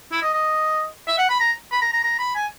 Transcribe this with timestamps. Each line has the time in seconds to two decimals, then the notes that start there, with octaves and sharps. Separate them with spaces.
0.12 E4
0.22 D#5
0.33 D#5
1.07 E5
1.18 F#5
1.29 B5
1.40 A#5
1.72 B5
1.82 A#5
1.93 A#5
2.03 A#5
2.19 B5
2.35 G#5